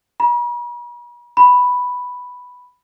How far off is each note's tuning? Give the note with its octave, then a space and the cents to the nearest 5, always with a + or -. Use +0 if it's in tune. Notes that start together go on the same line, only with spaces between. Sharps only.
B5 -45
B5 +0